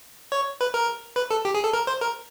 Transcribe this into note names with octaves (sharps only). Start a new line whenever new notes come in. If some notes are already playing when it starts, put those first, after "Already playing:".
C#5
B4
A#4
B4
A4
G4
G#4
A4
A#4
C5
A#4